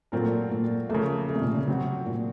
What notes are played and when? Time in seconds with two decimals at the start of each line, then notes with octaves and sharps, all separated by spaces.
0.12 A#2 F#3 A3 C4 F4 A#4
0.51 A#2
0.90 C#3 F3 A3 A#3
1.29 A3
1.35 C3
1.41 A#2
1.54 C#3
1.68 C3 F#3 C4 F#4
2.06 A#2